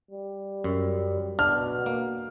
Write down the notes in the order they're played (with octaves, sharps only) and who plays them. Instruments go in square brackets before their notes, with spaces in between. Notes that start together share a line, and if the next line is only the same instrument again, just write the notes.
[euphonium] G3
[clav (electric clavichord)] F#2
[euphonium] B2 [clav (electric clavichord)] D4 [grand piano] F6
[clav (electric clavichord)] A#3